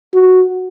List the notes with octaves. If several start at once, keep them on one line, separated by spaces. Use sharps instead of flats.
F#4